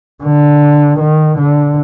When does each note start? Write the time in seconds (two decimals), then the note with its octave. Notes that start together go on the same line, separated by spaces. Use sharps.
0.24 D3
0.99 D#3
1.38 D3